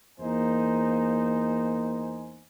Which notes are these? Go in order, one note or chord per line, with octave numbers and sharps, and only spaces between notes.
E2 A#3 D#4 C5 G#5